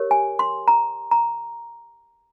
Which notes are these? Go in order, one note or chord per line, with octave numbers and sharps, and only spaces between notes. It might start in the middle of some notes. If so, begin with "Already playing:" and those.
Already playing: G4 A#4 C#5
G#5
C6
A#5
A#5